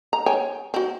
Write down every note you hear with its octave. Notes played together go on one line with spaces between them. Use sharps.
A#5
C#5 G5 G#5
C4 F#4